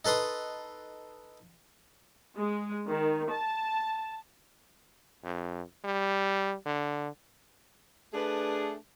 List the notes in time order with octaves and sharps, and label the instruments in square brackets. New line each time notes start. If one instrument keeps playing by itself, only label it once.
[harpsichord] D#4 A4 B4 C6 D#6
[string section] G#3
D#3
A5
[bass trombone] F2
G3
D3
[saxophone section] A3 D4 G#4 B4